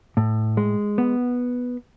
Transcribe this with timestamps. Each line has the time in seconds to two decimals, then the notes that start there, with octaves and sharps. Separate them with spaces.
0.17 A2
0.57 G#3
0.98 B3